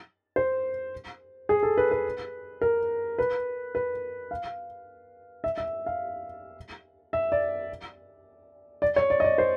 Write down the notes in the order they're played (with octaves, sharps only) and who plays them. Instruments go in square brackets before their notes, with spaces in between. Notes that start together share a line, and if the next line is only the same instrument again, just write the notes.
[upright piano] C5
G#4
A4
B4
B4
A#4
B4
B4
F5
E5
E5
F5
E5
D5
D5
C#5
D5
D#5
D5
C5